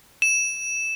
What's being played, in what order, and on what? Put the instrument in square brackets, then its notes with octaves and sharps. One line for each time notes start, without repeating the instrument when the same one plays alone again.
[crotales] E7